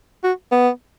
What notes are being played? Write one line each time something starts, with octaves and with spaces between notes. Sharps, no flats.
F#4
B3